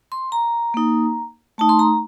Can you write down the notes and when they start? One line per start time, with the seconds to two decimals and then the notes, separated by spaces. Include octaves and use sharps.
0.12 C6
0.32 A#5
0.74 A#3 D#4
1.58 A3 D#4 A5
1.69 C6
1.79 A#5